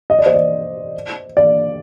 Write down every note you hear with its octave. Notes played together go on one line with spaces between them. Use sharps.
D#5
D5
C5
D5
D5